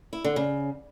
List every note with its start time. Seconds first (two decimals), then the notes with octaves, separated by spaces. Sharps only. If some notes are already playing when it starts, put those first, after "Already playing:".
0.13 E4
0.24 D3
0.36 C#3